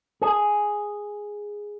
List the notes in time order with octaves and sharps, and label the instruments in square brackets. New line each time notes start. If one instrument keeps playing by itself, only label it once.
[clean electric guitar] G#4